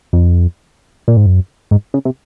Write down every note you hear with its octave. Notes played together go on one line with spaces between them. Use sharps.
F2
A#2
G#2
F#2
G#2
C#3
C3